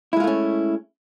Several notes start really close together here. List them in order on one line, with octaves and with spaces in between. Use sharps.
E4 G#3 F4 A3 C#4